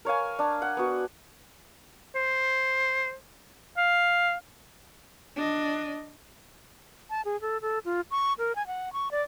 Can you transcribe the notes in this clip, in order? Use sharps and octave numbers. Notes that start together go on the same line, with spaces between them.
A#4 C#5 F5 G#5
D4
F#5
B3 F#4
C5
F5
D4 D#5
A5
G#4
A4
A4
F4
C#6
A#4
G#5
F#5
C#6
D5